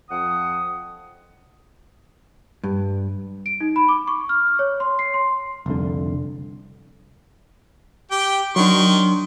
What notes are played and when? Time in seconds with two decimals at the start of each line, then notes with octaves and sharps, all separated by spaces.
0.09 F2 F#5 D#6
2.63 G2
3.46 D7
3.61 D#4
3.76 B5
3.89 D6
4.07 C#6
4.29 F6
4.59 C#5
4.80 C6
4.99 C7
5.14 C6
5.66 F1 C2 D3
8.11 G4 G5
8.56 D#3 F#3 D4 C6 C#6